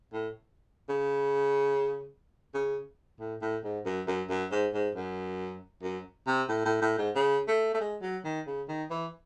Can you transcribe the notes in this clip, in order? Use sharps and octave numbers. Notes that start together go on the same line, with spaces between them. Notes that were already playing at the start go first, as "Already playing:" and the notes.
A2
C#3
C#3
A2
A2
G#2
F#2
F#2
F#2
G#2
G#2
F#2
F#2
C3
A2
A2
A2
G#2
C#3
A3
A3
G#3
F#3
D#3
C#3
D#3
E3